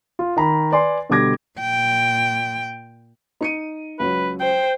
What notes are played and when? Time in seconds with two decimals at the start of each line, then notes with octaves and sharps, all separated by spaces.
0.19 F4
0.36 D#3 A#5 B5
0.72 B4 D5 G#5 C6
1.10 B2 D3 G3 D6 G#6 A#6
1.60 A#2 G5
3.41 D#4 C#7 D#7
3.99 C#2 F#3 B4
4.40 C5 G5